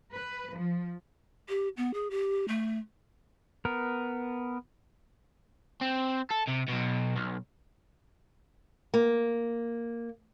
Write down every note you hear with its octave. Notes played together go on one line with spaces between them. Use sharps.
B4
F3
G4
B3
G#4
G4
A3
B3 A#4
C4
A4
C3
B1 B2
B1
A#3